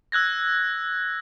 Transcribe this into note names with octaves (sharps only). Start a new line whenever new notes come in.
E6 F#6 G#6 A#6